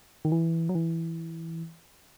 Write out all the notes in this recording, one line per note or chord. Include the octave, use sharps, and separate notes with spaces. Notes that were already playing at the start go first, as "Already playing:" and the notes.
D#3
E3
F#3
E3